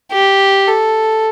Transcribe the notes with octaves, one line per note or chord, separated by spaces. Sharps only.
G4
A4